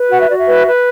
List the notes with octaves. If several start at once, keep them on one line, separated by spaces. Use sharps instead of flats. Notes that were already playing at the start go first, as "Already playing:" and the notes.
Already playing: B4
F#4 F#5
E5
F#4 D5
E5
B4
B4